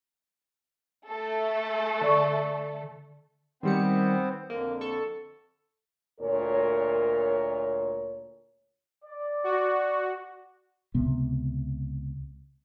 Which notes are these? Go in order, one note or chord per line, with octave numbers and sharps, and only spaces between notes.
A3 A4
D3 D5 C#6
D#3 G3 B3 C4 C5 C#7
F2 D3 A#3
A4 C#6
D2 A#2 A#4 C#5
D5
F#4
C#2 C3 B3